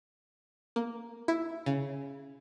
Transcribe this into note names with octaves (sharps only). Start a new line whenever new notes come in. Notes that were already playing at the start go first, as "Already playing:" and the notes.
A#3
E4
C#3